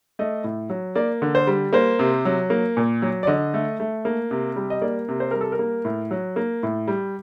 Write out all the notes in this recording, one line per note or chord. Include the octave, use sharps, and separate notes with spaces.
A3 D#5
A2
F#3
A#3 D5
D3
C5
G3
A#3 C5
C3
F#3
A#3
A#2
F#3
D5
D3 D#5
A3
A3
A#3
C3
G3
D#5
A#3 D5
C3
C5
G3 A#4
A4
A#4
A#3
A2
F#3
A#3
A2
G3